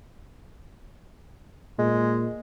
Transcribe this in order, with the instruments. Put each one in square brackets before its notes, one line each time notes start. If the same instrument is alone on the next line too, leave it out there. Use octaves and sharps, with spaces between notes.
[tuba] A#2 [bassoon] G#3